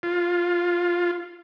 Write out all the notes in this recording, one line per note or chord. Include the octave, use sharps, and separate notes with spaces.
F4